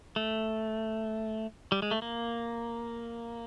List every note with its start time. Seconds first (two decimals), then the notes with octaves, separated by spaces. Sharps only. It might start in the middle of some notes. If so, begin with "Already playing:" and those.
0.16 A3
1.72 G3
1.82 G#3
1.91 A3
2.02 A#3